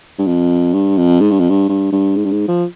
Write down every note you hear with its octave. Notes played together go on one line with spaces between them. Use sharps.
G2
F2
G2
F2
G#2
G2
F2
G2
G2
G2
G#2
G2
G#2
F3